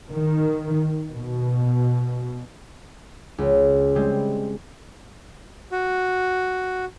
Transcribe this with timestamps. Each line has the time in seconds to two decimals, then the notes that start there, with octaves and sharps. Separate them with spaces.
0.11 D#3
1.12 B2
3.38 C#2
3.95 G3 G#3 C4
5.72 F#4